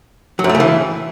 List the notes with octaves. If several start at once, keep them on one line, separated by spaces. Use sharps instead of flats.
F#3
F#2
A3
C#3
E3